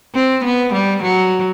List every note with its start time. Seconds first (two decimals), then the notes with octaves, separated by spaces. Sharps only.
0.15 C4
0.44 B3
0.73 G3
1.03 F#3